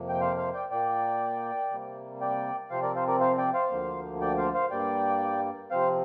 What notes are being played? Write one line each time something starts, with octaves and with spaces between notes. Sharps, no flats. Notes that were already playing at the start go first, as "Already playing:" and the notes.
Already playing: F2 C3 F3 A#3
G5
C5 F5
C5 F5
D5 G5
A#2 A#3 D5 G5
C3 G3 A#3
D5 G5
C3 F3 C4 C5 F5
A#4 D5
C5 F5
A#4 D5
C5 F5
D5 G5
C5 F5
D2 D3 F3 A#3
D5 G5
C5 F5
C5 F5
G2 G3 A#3 D5 G5
C3 F3 C4 C5 F5